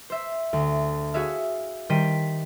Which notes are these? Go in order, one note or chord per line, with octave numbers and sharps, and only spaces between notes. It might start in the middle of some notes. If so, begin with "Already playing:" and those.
C5 E5
D2
F#4 G#4 C#5 E5 F5
D#3 G3 C5 G5 B6 D#7